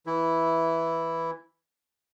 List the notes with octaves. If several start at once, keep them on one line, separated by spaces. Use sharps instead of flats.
E3 E4